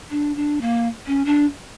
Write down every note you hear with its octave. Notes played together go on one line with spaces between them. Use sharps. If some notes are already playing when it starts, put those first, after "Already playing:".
D4
D4
A#3
C#4
D4